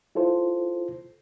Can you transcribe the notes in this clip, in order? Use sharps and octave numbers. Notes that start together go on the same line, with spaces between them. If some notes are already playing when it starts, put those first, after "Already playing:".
E4 F4 A4 C5